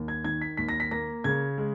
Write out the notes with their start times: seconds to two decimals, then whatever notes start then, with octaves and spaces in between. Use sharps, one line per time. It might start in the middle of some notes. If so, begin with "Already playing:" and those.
Already playing: D#2
0.08 G#6
0.24 D#3 G#6
0.41 B6
0.57 D#2 B6
0.69 A#6
0.80 B6
0.91 A#3 A#6
1.24 C#3 G#6
1.58 G#3